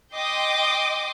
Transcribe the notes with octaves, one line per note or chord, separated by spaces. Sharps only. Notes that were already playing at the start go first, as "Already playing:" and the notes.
D#5 G5 C6 D6 D#6